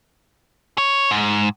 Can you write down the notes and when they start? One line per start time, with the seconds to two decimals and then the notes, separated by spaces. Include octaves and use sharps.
0.78 C#5
1.11 G#2